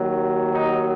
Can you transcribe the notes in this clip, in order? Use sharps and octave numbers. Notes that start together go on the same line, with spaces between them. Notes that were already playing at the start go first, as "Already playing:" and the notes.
Already playing: D#2 D#3 F#3
D#4